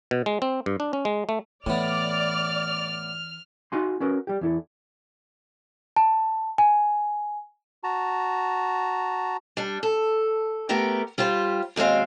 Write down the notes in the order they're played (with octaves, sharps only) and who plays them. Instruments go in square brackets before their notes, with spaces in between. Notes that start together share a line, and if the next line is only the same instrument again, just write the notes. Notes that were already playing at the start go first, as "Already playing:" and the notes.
[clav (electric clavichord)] B2
G#3
C4
G2
D4
C#4
G#3
A3
[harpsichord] A2 B3 [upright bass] E3 [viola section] D5 [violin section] F6
[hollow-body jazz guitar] D#4 F#4 F5 G#5 C6
C#4 F#4 A#4 B4
G3 G4
E2 E4 A4
[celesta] A5
G#5
[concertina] F#4 A5 A#5
[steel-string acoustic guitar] G3 D4
A4
A3 B3 G4 A#4 G5
G3 F4 G4 C5
D#2 B2 G#3 C4 F5